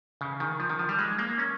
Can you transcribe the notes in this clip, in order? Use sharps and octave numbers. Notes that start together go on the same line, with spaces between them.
C#3
D#3
F3
D#3
F3
G3
G#3
A#3
C#4